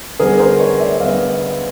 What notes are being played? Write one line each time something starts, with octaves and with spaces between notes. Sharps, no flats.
D3 G3 B3 G#4 A#4
A#4 C5
C#5 D#5
D5 E5
E5
D3 G3 B3 D#5 F5